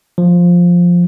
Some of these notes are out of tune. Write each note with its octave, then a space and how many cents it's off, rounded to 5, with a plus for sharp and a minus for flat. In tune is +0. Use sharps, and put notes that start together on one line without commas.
F3 +5